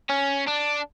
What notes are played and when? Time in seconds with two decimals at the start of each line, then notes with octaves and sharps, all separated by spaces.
0.10 C#4
0.47 D4